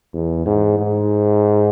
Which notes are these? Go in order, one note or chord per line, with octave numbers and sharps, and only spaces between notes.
E2
G#2
G#2